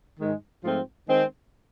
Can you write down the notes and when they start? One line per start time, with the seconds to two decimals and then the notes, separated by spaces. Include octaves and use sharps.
0.19 G#2 D#3 G#3
0.64 G#2 F3 A3 C4 F4
1.07 D#3 G#3 C4